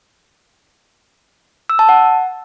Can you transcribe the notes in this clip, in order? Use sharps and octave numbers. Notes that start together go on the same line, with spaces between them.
E6
A5
F#5